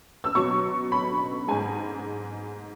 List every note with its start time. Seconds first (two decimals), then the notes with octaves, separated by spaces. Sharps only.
0.24 E6
0.35 B2 F#3 C#6
0.92 B5
1.48 G#2 G#3 G#5